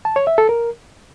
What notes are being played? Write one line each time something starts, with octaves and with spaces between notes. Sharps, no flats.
A5
C#5
E5
A4
A#4